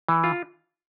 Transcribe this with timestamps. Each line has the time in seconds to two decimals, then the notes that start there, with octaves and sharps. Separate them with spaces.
0.09 E3
0.24 F4